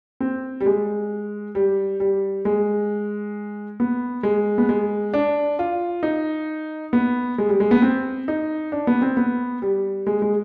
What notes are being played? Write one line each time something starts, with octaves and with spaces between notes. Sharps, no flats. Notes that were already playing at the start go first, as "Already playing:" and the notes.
C4
G3
G#3
G3
G3
G#3
B3
G#3
B3
G#3
D4
F4
D#4
B3
G#3
G3
G#3
B3
C4
D#4
D4
B3
C4
B3
G3
G#3
G#3